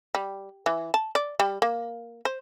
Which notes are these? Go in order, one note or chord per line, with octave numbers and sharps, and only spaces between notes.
G3
E3
A5
D5
G3
A#3
C5